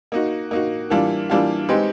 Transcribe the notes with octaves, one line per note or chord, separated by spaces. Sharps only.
A#3 D#4 F#4
A#3 D#4 F#4
E3 G3 A#3 D4 F4
E3 G3 A#3 D4 F4
G#3 C4 D#4 G4 B4